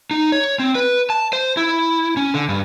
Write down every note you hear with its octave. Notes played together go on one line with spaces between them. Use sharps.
D#4
C#5
C4
B4
A5
C5
E4
C#4
D3
G2